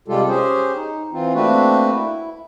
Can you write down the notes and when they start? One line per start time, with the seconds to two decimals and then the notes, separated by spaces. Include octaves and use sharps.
0.08 C3 G3 G#3 F4 G4 A4
0.28 C#4 G4 G#4 C5
0.76 D#4
1.12 E3 C4 F4
1.34 A3 A#3 C4 D4 F#4 B4
1.93 E4